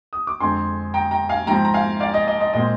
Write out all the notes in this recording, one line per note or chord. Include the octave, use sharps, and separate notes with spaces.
D#6
D6
F2 D3 G#3 C4 G#5 C6
G5 A#5
G5 A#5
F5 G#5
G#2 F3 C4 G5 A#5
A#5
F5 G#5
D5 F5
D#5
D#5
D#5
A#2 G#3 C4 D#5